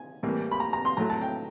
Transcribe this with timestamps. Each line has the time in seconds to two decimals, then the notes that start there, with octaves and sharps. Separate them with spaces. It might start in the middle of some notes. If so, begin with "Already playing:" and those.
Already playing: G#5
0.23 A2 E3 G3 A#3
0.51 B5
0.60 A#5
0.73 A#5
0.85 C6
0.97 A2 F#3 A3 A#5
1.10 A5
1.22 G5